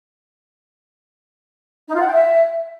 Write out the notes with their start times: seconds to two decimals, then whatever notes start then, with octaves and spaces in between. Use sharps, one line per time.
1.88 D#4
1.94 F4
2.00 F#5
2.06 G5
2.13 E5